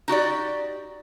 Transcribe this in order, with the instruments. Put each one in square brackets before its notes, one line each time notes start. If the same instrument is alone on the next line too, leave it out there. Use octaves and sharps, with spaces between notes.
[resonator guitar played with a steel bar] D#4 F#4 G4 D5